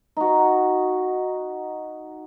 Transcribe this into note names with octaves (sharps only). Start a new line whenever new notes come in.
D#4 F#4